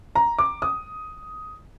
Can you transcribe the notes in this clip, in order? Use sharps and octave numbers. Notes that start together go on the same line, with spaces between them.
A#5
D6
D#6